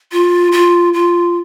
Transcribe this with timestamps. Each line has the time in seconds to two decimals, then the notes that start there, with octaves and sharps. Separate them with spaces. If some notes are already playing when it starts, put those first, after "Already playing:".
0.12 F4
0.52 F4
0.93 F4